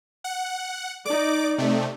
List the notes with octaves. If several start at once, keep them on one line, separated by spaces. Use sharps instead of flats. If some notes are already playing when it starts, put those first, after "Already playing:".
F#5
D#4 D5 D6
C3 A3